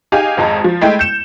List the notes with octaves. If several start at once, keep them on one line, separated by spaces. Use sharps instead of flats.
D#4 G4 G#4 F5 G#5
G#1 F2 G#3 A#5
F3
G#3 A3 E4 G5
G6 C#7 E7